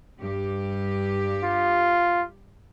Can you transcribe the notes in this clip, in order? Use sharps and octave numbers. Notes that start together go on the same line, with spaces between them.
G2 G4
F4